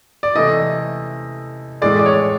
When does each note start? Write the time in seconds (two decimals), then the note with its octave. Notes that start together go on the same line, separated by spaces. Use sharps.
0.23 D5
0.35 C3 E3 A3 D#5
1.82 A2 E3 G#3 D5
1.99 D5
2.06 C#5